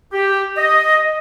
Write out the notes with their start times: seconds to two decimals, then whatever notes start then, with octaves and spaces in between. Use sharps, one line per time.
0.12 G4
0.57 D#5